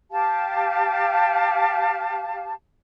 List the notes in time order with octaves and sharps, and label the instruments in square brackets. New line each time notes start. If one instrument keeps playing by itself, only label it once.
[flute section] G4 F5 A5